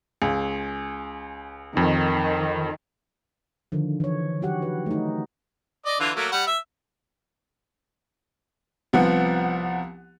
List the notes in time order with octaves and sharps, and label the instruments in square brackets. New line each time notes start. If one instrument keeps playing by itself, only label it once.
[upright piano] C#2 G#4
[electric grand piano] F2 [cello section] D#3
[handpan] D3 D#3 F3
E3 C#5
F#3 F#4 G4 F#5
B4
A3 D#4
[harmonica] D5 D#5
D3 E3 F4
F#3 A3 A#3
G3 F#5
E5
[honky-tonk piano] C2 F3 B3 F#5